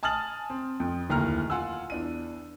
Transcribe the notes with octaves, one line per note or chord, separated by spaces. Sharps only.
G#5 A5 D#6 F6 A6 F#7
C4
F2
D1 D#2 A2 A#5 F6
F4 F#5 G#5 E6
E2 D4 D#7